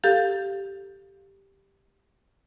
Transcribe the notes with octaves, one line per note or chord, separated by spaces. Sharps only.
G4 A4 F5